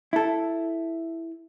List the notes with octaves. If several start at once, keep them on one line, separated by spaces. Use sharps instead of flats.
E4 A4